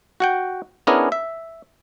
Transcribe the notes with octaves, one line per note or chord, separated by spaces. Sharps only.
F#4 F#5 G5
B3 C#4 D4 E4 G#4 A#4
E5